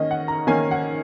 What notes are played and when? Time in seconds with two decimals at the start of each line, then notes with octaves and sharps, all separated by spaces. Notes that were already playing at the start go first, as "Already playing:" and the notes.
Already playing: D#3 A#3 C#4 D#5
0.11 F#5
0.28 A#5
0.47 D#3 A#3 C#4 G#5
0.71 F#5